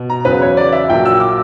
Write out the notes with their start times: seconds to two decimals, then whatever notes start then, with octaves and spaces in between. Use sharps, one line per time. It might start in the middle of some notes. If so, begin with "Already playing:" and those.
Already playing: B2
0.10 A#5
0.25 E2 C#3 F#3 B4
0.42 C#5
0.57 D5
0.72 E5
0.89 A#1 A#2 F#3 G5
1.05 E6
1.20 D6